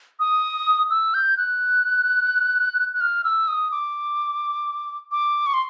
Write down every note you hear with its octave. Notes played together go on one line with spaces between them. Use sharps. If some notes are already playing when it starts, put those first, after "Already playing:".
D#6
E6
G6
F#6
F#6
F6
E6
D#6
D6
D6
C#6
C6